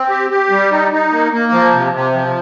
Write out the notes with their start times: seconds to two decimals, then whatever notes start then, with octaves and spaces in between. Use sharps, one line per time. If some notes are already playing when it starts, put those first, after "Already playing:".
Already playing: C4
0.09 G4
0.30 G4
0.50 G3
0.71 D#4
0.92 D#4
1.12 A#3
1.32 A#3
1.52 F3
1.73 C3
1.93 C3
2.13 F3